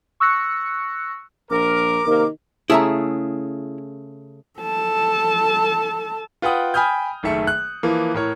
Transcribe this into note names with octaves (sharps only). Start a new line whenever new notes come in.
C#6 E6 F#6 A#6 C#7
A#1 A#4 D6
C3 D#3 A#3 A#4
C#3 A3 E4 G#4 E5 A#5
A4 A5
F4 B4 F#5 G5 D#6
G5 G#5 B5 D#6 F6 G6
F#1 D#3 A3 E5 C#7
F#6
E3 F3 A#3
A2 A#4 C#5